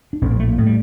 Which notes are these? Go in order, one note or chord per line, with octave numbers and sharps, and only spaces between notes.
D4
A#1 A2 C4
A#3
G3
A3
A#3
A2 A3
G3